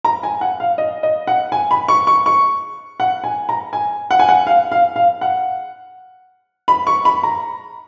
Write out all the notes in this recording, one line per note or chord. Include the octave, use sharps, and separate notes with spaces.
A#5
G#5
F#5
F5
D#5
D#5
F#5
G#5
B5
C#6
C#6
C#6
F#5
G#5
A#5
G#5
F#5
G#5
F#5
F5
F5
F5
F#5
B5
C#6
B5
A#5